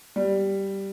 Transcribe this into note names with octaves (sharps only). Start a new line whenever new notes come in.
G3